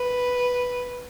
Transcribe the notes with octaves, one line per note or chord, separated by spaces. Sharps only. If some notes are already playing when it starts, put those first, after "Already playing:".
Already playing: B4